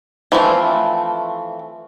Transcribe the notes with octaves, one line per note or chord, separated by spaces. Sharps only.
E3 F3 A3 C4